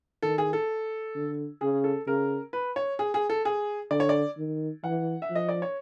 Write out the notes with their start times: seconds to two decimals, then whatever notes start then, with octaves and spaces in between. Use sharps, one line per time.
0.23 D#3 A4
0.38 G#4
0.53 A4
1.15 D3
1.61 C#3 G#4
1.84 A4
2.07 C#3 A#4
2.53 B4
2.76 C#5
2.99 G#4
3.14 G#4
3.30 A4
3.45 G#4
3.91 D3 D5
4.00 C#5
4.09 D5
4.37 D#3
4.84 E3 F#5
5.22 E5
5.30 F3
5.35 D#5
5.49 D5
5.62 C#5